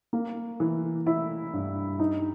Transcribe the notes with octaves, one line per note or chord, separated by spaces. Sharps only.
A#3
E3
E4
G2
D#4